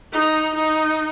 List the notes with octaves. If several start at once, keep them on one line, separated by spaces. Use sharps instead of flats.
D#4
D#4